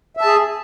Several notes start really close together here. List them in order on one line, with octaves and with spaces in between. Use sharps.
E5 A5 G#4